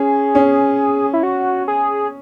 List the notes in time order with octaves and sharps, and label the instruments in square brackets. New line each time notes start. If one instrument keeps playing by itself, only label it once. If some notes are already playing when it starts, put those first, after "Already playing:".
Already playing: [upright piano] C#4 [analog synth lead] G#4
[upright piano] C#4
[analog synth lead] E4
F#4
G#4